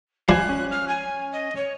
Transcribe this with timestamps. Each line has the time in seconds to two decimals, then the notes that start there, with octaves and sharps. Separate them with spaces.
0.29 F3 D4 F5 G#5 F#6
0.49 C#4
0.71 F6
0.88 G#5
1.32 D#5
1.56 C#5